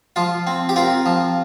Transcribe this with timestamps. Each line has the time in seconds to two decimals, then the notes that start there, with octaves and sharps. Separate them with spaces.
0.16 F3 F4
0.47 C4
0.69 G4
0.76 C4 F4 A#4
1.06 F3